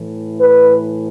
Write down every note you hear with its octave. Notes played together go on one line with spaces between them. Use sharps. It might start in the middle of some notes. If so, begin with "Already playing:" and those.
Already playing: A2 E3
B4